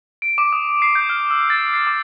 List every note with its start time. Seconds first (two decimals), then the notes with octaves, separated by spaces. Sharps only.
0.22 D7
0.38 D6
0.53 D#6
0.82 C7
0.95 G6
1.09 F6
1.31 E6
1.50 A6
1.74 C7
1.87 D6